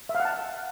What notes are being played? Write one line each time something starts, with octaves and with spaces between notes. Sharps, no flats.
E5
F5
F#5
A5